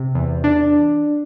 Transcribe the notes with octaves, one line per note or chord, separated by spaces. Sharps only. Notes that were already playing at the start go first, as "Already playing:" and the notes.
Already playing: C3
E2
D4